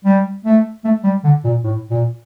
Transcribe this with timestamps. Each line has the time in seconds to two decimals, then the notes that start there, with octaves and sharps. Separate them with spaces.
0.05 G3
0.45 A3
0.84 A3
1.04 G3
1.24 D3
1.44 A#2
1.64 A2
1.91 A#2